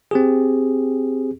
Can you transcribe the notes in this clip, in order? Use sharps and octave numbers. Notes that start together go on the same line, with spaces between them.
C4 G4 G#4